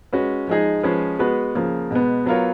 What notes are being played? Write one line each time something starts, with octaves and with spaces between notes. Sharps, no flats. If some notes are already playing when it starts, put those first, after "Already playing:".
G#3 C#4 F#4 B4
F3 G#3 D#4 G#4
F3 G#3 C#4 G#4 B4
G#3 B3 F#4 B4
C#3 F3 A#3
B2 G#3 B3
F#3 B3 F4 A#4 C#5